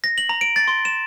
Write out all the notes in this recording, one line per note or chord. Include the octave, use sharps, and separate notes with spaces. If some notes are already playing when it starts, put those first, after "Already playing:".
A#6
F#7
A#5
D7
A6
C6
E7